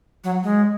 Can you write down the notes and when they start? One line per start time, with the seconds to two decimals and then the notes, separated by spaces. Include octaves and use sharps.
0.24 F#3
0.43 G#3